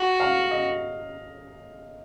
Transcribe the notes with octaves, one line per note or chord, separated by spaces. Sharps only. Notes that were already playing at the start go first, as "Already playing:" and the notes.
Already playing: F#4
F5
D#5